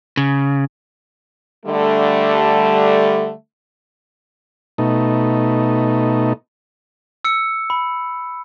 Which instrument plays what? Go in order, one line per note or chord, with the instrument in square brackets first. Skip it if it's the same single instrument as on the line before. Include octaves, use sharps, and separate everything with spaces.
[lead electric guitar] C#3
[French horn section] D3 G3 A3
[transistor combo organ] B2 A3 D#4
[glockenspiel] E6 C#7
B5